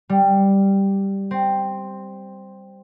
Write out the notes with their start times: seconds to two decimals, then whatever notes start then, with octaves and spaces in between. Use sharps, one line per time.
0.09 G3
1.31 C4